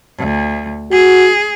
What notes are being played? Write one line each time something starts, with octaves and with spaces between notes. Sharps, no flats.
D2
F#4 G#4